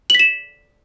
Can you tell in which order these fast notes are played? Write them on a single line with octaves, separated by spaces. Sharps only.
F#7 B6 E7